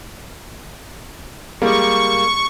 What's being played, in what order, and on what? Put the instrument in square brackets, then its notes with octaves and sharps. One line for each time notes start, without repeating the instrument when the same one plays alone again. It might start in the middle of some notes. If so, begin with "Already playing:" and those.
[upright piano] G3 G#3 A#3 [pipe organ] C#6